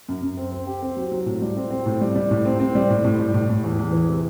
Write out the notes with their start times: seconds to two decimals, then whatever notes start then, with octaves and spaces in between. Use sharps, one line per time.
0.09 F#2
0.22 F#2
0.37 C4
0.52 C4
0.67 G4
0.82 C4
0.96 F#3
1.12 F#3
1.26 A2
1.42 G3
1.57 C4
1.71 C4
1.86 A2
2.01 G3
2.16 G3
2.31 A2
2.45 C4
2.60 C4
2.75 G3
2.90 A2
3.04 A2
3.20 G3
3.34 A2
3.49 A2
3.64 E2
3.79 E2
3.93 E3
4.07 C3